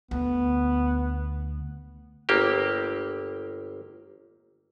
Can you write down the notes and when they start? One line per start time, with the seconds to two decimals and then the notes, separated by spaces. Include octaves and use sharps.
0.11 D2 B3
2.29 G1 A#3 G4